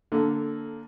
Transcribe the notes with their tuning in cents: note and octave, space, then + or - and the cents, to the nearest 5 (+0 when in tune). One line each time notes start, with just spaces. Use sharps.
D3 +0 A#3 +0 A4 -10